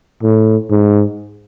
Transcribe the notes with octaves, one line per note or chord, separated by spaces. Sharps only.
A2
G#2